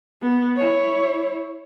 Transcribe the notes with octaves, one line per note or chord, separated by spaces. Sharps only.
B3
E4 C#5